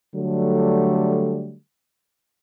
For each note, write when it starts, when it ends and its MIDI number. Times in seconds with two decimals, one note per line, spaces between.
0.15 1.55 50
0.15 1.55 54
0.15 1.55 55
0.15 1.55 57